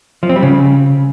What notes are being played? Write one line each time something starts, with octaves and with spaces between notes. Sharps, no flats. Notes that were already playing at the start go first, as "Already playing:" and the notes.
F3
C4
G3
C#3